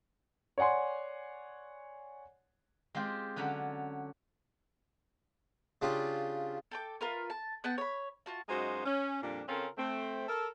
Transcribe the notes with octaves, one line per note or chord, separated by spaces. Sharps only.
C#5 D5 F#5 G#5 C6
G#3 C4 F4 G4
D3 F#3 C#4 D4 B5
C#3 D4 F4 G4
A4 G5 D6
F4 A#4 B4
A5
B3 F#5 G5 A5
C#5 B5
F4 F#4 A5
F#2 G#3 D#4 F4 F#4 C5
C#4
F2 A#2 G3 D4
C#3 C4 C#4 F4 A4 A#4
A3 C4
A4 A#4